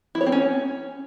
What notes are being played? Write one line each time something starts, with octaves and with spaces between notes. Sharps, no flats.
E4
C#5
C4
C#4